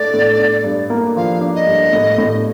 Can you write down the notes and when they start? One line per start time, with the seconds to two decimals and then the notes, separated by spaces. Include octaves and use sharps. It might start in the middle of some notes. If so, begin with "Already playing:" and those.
Already playing: A2 A3 D4 A4 D5
0.14 A2
0.39 D4
0.64 G2
0.90 A#3
1.16 F3 F5
1.41 D4
1.54 D#5
1.67 G2
1.93 A2
2.18 A2